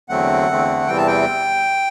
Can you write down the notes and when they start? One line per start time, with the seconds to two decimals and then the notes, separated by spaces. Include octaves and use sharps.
0.09 E2 D3 F#3 A3 C4 F#5
0.48 E2 D3 A3 C4
0.87 E2 C3 E3 G3 C4 G5
0.97 A5
1.07 G5